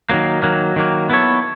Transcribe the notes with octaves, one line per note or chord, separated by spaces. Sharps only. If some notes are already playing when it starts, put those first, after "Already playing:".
D#3 F#3 A#3
D#3 F#3 A#3
D#3 F#3 A#3
B3 E4 A4 C#5